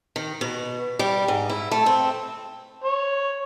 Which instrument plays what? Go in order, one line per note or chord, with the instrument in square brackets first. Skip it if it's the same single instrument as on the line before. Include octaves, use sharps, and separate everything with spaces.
[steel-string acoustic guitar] D#3
B2
G3
G#2
E4
A3
C4
[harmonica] C#5